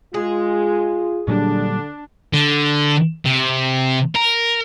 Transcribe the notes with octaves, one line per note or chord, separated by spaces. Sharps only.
G#3 F4 G#4
A#2 D3 F#3 G3 D4
D3
C3
A#4